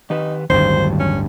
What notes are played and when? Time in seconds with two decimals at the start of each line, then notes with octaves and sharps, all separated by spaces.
0.10 D#3 D#4 G4 B4
0.50 D1 G1 G2 D#3 F#3 C5
0.99 C#4